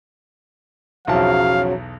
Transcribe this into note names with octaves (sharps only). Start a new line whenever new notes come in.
B1 E2 C#3 F3 F#3 F#4 F5 A5